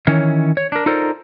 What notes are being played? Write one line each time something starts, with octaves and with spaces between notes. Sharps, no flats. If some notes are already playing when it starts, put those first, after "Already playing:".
D#3 E3 C#4 C#5
C#5
D4 A#4
D#4 F4 A4 A#4 C5 D5